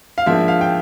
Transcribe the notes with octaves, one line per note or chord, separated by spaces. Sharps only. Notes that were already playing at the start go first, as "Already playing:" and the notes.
F5
G#2 F3 A#3 D4 E5
F5
G5